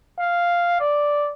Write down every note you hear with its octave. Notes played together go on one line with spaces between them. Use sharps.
F5
D5